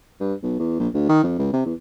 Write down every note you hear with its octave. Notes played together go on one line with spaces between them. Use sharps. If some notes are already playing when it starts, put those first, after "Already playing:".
G2
B1
E2
A#1
D2
D#3
F2
C#2
C3
E2